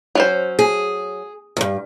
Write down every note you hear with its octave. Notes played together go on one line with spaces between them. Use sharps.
F#3 C#4 C5
G#4
E2 G2